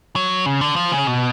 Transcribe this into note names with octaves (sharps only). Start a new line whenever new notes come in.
F#3
C#3
D3
F3
C#3
B2